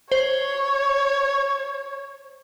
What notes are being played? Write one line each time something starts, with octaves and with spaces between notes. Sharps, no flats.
C5 C#5